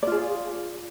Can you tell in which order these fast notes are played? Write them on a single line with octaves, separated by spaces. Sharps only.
D5 F4 G#4